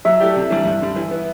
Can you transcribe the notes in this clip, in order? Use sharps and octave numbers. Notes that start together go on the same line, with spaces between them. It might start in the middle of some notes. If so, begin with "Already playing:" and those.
F#3 E5
A3 E4 G4 D5
C3
E3 G3 D4
G2
D3 G3
E3
B3 E4